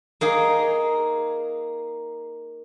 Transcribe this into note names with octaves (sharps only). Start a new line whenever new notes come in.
A#3 D#4 G#4